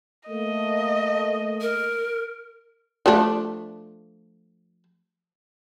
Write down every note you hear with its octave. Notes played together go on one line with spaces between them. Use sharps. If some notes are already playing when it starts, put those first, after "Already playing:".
A3 A#3 D#5
A#4
F3 A3 D4